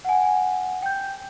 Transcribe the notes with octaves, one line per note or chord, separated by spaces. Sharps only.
F#5 G#5
G5 G6